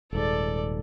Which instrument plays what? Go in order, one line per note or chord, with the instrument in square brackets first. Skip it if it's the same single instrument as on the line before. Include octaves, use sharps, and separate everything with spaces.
[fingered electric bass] D#1 G#2 [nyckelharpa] A4 D5